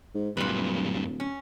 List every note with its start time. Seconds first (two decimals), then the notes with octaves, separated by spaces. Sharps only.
0.14 G#2
0.37 D1 F#2 A#2 G3 B4
1.20 C#4